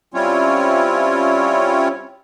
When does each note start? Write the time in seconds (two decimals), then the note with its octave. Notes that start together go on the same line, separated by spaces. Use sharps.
0.14 G3 C4 C#4 E4 F4 C#5